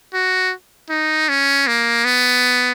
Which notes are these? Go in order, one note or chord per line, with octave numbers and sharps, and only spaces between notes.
F#4
D#4
C#4
A#3
B3